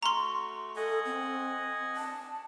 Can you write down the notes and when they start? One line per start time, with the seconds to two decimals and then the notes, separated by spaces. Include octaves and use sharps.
0.03 A3 F#4 A#5 C6 C#6
0.76 A4 D#5 F#5 G#5
1.05 C4
1.97 A5